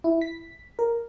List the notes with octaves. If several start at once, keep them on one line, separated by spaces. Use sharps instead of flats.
E4
B6
A#4